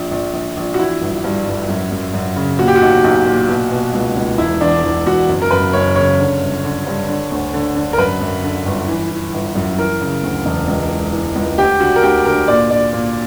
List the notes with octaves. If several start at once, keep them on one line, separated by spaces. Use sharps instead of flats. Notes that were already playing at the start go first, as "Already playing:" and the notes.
Already playing: A#1
A#1
A#1
A#1
F#4
E3 E4
G1
G2
G1
F#2
F#2
F#2
C#3
A#2 F#4
G4
F#4
B1
B1
A#2
B2
B2
C#2
C#2
E1 E4
E2 D4
E2
E1 F#4
F#1
A#4
F#2 B4
F#1 C#5
C#3 C#5
D3
G1
D3
G2
D3
D2
D3
D3
A#4
F#2 B4
F#2
D3
G1
E3
E3
G1
F#2
E3 A#4
C#3
D2
E1
C#2
E3
E3
C#2
D2 G4
D3 F#4
A#4
D2 G4
D3 A#4
A#2 D5
A#2 D5
A#2